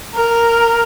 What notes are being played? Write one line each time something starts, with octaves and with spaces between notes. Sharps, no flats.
A#4